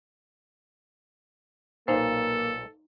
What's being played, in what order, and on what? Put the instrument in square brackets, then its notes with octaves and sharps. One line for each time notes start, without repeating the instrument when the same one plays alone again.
[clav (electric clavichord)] B1 A#2 [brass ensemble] A#3 [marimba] D#4 C5 [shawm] A4